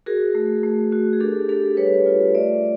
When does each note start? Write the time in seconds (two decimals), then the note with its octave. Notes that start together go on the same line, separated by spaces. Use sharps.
0.06 F#4 G#4 A#4
0.35 A3
0.63 A3
0.92 F#4
1.13 G#4
1.20 D4 G4 A4
1.49 D4 G4 A4
1.77 G3 B4 C#5
2.06 F4
2.34 A3 D5 E5